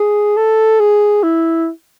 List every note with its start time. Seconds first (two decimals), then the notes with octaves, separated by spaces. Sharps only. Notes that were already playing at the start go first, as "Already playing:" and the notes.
Already playing: G#4
0.37 A4
0.80 G#4
1.23 E4